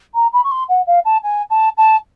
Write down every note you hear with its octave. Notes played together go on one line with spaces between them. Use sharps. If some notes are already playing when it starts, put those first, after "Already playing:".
A#5
B5
C#6
C6
F#5
F5
A5
G#5
A5
A5